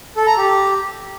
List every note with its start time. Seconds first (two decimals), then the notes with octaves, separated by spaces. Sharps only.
0.17 A4
0.27 A#5
0.37 G4